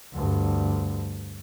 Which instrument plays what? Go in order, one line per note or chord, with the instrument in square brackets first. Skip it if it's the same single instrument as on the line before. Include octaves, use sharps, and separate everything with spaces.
[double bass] D2 G2